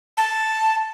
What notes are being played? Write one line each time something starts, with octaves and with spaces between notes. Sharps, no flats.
A5